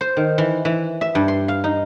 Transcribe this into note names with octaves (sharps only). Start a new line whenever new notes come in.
C5
D#3
E3
E3
E5
G2
C6
F5
D#4